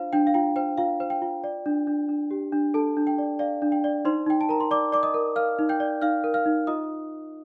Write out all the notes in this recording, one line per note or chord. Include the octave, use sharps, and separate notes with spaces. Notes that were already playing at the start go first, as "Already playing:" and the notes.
Already playing: D4 F4 C5 F5
D4 G5
F5
F4 G5
C5 G5
F4 F5
C5
G5
F4
D5
D4
D4
D4
G4
D4
D4 A4 A5
D4
G5
D5
D5 F5
D4
G5
D5
D#4 C5 C6
D#4 G5
A5
A#4 A#5
C6
D5 D6
D5 D6
D#5 D#6
A#4
A#4 F5 F6
D#4
G5 G6
D5
D#4 F5 F6
A#4
F5 F6
D#4
F4 D#5 D#6